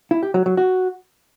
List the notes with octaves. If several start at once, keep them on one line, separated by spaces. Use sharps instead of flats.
E4
G4
F#3
F#3
F#4